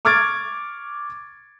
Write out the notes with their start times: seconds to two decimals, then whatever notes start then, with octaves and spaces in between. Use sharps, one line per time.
0.05 C#6 D6 F6 G#6 A6 D7